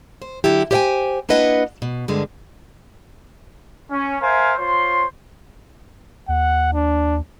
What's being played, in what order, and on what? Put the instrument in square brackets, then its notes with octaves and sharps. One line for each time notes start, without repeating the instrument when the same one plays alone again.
[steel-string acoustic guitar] C5
D3 F#3 E4 G4
G4 C5 C#5 E5 G5 G#5
A#3 D4 E4 B4 D#5 F#5
B2
G2 D3 G#3
[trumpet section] C#4
A#4 C5 E5 F5 G#5
F4 C5 C#5 C6
[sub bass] D#2 [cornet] F#5
[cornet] D4